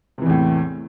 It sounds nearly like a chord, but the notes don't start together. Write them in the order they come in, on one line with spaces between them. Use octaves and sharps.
C3 E3 E2 A2